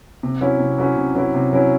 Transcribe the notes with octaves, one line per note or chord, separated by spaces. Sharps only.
C3
F#3 C#4 E4
C3
F#3 C#4 E4
C3
F#3 C#4 E4
C3
F#3 C#4 E4